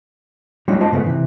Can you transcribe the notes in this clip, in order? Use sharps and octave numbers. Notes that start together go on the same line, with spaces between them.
G3 A3 C#4 D#4 F4 F#4
G#3 F4 C5 D#5 A5
G#2 C#3 A3 B3
C3 E3